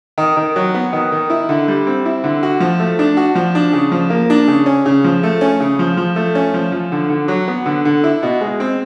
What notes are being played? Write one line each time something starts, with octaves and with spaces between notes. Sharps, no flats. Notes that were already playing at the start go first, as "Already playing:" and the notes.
D#3
D#3
F#3
B3
D#3
D#3
E4
D3
G3
C4
E4
D3
F#4
F3
A3
D4
F#4
F3
D4
C#3
F3
A#3
D4
C#3
C#4
C#3
F3
A3
C#4
C#3
F3
F3
A3
C#4
F3
F3
D3
D3
F#3
B3
D3
D3
E4
B2
G#3
C4